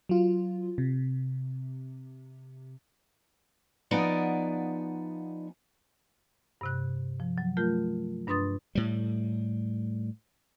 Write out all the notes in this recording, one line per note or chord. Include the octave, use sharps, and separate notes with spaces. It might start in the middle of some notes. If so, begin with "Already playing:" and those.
F#3 F4
C3
F3 B3 D#4 D5 F#5 G#5
G2 C3 F#6
F3
F#3
A3 F4 A#4 G6
G2 D4 B4 C6 D#6 A6
A2 G3